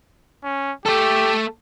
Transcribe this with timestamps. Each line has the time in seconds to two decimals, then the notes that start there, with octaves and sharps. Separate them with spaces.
0.44 C#4
0.86 A3 G4 A4